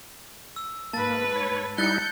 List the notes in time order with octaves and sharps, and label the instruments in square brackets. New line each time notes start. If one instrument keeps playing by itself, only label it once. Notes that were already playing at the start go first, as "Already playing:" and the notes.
[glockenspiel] E6
[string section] G#2 B4 [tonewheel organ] A#3 [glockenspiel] A5 A6
[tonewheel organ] C#5
[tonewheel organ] G3 D#4 E4 [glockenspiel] F#6 A6 [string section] G6 C#7